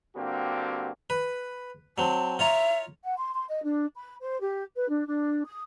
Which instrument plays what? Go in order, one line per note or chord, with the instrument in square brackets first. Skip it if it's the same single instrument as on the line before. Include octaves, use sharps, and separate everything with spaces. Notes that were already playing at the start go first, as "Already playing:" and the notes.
[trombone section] G2 D3 A#3 C4 F#4 G4
[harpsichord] B4
[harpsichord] F#3 C4 [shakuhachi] A5
[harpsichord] F4 C#5 A#5 [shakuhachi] E5
[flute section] F#5
C6
C6
D#5
D4
B5
C5
G4
B4
D4
D4
D#6